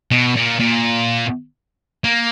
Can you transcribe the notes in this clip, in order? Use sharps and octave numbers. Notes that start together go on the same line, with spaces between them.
B2
A#2
A#2
A#3